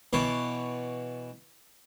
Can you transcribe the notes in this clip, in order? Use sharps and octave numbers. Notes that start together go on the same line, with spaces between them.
B2 E3 B3 C#5 C6 D6